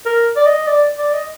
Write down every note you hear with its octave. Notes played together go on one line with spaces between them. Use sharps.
A#4
D5
D#5
D5
D5
D#5